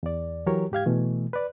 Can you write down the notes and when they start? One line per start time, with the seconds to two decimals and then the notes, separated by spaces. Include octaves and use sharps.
0.03 E2 D5
0.46 E3 F#3 G4 A#4 C#5
0.72 G#2 G4 F5 G#6
0.86 B2 E3 A3
1.33 B4 D5